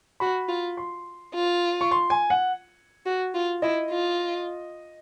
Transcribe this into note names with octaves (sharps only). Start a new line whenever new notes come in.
F#4 B5
F4
C6
F4
C#6
C6
G#5
F#5
F#4
F4
E4 D#5
F4